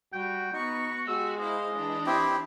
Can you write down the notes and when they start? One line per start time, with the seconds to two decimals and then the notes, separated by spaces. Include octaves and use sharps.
0.13 G3 F#4 G5
0.53 B3 D#4 F#4 C#6
1.08 G#3 F#4 G4 E6
1.39 E4 C5 D#5 F5
1.74 E3 D4
2.06 C4 E4 G4